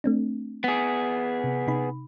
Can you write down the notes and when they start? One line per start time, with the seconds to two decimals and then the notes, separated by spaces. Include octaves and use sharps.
0.04 A3 C4 D4
0.64 B3 G#4
1.44 C3
1.67 C3 D#4 B5